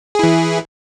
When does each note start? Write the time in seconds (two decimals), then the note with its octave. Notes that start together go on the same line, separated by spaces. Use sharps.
0.15 G#4
0.19 E4
0.23 E3